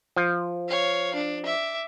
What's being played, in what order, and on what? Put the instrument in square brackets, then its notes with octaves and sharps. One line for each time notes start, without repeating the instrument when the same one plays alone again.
[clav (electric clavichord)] F3
[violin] C#5 F5
D4
E5 D6